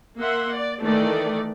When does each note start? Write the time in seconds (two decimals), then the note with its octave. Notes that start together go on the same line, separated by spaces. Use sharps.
0.18 A#3 E5 F#5 C6
0.52 D5
0.83 D#3 E3 A3 D5